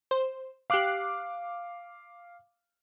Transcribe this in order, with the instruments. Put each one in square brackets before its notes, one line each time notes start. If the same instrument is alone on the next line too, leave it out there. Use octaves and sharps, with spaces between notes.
[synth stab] C5
[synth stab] G4 F#6 C7 [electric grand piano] F5 D6